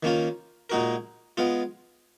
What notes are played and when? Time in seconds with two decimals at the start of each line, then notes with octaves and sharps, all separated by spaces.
0.03 D#3 A#3 C#4 F4
0.70 A#2 G#3 D#4 F#4 A#4
1.37 G#3 B3 F4